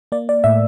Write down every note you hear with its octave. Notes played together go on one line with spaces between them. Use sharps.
A#3 D5
D5
A2 E5